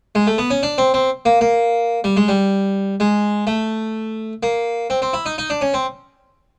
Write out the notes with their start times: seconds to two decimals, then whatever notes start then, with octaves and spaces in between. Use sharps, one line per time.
0.15 G#3
0.27 A3
0.38 B3
0.50 C#4
0.63 D4
0.78 C4
0.94 C4
1.25 A#3
1.41 A#3
2.04 G3
2.17 G#3
2.28 G3
3.00 G#3
3.47 A3
4.43 A#3
4.90 C4
5.02 C4
5.13 E4
5.26 D#4
5.38 D#4
5.50 D4
5.61 C#4
5.74 C4